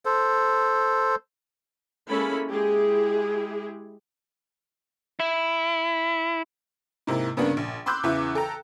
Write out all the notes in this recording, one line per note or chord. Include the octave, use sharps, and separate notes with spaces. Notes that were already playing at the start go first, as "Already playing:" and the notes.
A4 C5
G#3 A#3 C#4 E4 A4 B5
G#3 E4 G4 G#4
E4
G#2 C3 A#3 E4
G2 C#3 A#3 B3 D4
A#1
B5 C6 D6 E6 F#6 G6
E2 C#3 E3 E5 D6
A4 G5 A#5